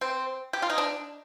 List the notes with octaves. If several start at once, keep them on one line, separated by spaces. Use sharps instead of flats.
C4
G4
F4
D#4
D4